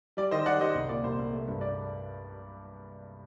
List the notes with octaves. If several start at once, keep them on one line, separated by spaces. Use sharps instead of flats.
G3 D5
D#3 C5 D#5
G3 D5 F#5
G3 C5 D#5
C2
A#2 D5
C2 C5
C2
A3
G2
D5